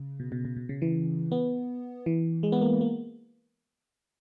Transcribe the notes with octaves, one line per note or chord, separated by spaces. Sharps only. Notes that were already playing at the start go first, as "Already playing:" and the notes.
Already playing: C#3
B2
B2
B2
B2
C#3
E3
B3
E3
G#3
B3
A#3
A#3